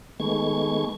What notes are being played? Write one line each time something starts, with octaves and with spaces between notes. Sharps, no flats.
D#3 G#3 A3 B3 C#6 G#6